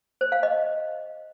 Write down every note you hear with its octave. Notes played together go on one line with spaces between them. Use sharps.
C5
F5
D#5